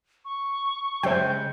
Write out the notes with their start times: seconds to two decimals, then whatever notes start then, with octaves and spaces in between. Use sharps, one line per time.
0.25 C#6
1.03 C#3 G#3 C5 E5 G5 G6